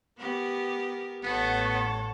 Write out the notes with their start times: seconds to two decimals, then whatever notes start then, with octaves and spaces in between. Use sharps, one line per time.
0.18 B3 G4 A#4
1.23 A1 A2 B3 A4 C#5 F#5